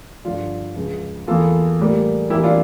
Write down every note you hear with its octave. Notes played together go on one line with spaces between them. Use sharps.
G2 D3 F3 D4 F4
C#2 C#3 F3
E2 E3 A#3 F4 A4
A2 G3 A#3
F2 E3 G3 A#3 E4 G4
D4 F4